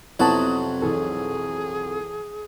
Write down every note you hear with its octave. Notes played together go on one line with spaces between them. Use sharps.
F2 C3 F#3 B3 E4 F#4 A5 D#6
B1 E3 G#4 A4